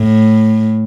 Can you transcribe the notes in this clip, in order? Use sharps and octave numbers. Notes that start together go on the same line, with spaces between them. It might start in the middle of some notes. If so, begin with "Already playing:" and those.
Already playing: A2